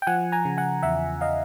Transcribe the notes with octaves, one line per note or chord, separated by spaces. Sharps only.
G5
F3 F#5 G#5
G#5 A#5
C#3
F#5 G#5
E2 E5 F#5
D#5 F5